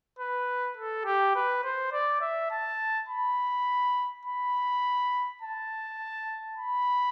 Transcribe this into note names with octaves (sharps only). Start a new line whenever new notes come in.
B4
A4
G4
B4
C5
D5
E5
A5
B5
B5
A5
B5